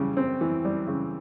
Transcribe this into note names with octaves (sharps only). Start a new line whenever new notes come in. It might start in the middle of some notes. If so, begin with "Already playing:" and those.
Already playing: C#3 E3 G3
C4
E3
G3
C#3